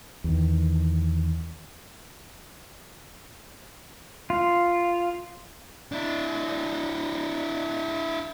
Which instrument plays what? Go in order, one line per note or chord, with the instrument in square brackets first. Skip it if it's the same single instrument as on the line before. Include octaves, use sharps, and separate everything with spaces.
[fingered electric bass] E2 D#3
[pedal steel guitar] F4
[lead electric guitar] D4 E4